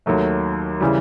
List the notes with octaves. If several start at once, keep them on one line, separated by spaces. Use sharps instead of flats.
D#2 D#3 F#3 A3
C#3 E3 G3